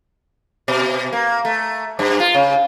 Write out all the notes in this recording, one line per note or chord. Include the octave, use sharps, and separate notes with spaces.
B2
A#3
A3
G2
F4
C#3